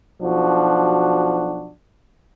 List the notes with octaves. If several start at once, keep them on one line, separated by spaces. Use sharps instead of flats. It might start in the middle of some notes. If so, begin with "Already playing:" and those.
B1 F3 D4 F#4